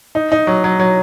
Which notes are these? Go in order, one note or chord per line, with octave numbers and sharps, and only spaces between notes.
D#4
D#4
F#3
F#3
F#3